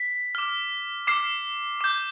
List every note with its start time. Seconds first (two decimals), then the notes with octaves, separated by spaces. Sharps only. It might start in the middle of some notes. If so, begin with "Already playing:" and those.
Already playing: B6
0.35 D6 F6
1.07 D6 F6 C7
1.81 D6 G6